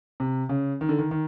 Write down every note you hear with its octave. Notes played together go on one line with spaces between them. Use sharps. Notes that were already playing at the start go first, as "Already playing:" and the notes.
C3
C#3
D#3
D3
D#3
D#3